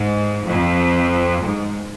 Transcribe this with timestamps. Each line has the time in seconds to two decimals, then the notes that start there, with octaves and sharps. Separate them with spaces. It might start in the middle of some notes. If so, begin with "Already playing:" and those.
Already playing: G#2
0.49 F2
1.44 G#2